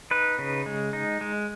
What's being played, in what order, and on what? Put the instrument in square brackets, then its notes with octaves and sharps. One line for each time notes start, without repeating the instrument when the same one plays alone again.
[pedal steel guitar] D#4 B4
C#3
G#3
D#4
G#3